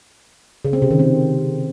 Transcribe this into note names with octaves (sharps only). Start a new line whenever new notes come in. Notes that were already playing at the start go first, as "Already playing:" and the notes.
C#3
C4
C3
D#3
C4